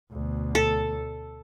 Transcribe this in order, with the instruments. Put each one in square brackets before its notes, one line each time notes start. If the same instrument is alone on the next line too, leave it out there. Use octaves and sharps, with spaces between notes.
[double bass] D2 B2
[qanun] A4